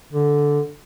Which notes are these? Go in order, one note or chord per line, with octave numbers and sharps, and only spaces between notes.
D3